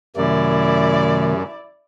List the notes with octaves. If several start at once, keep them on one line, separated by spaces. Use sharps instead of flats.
F#2 C3 D#3 A3 E4 D5